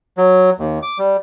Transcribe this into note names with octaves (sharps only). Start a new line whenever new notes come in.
F#3
D#2
D6
G3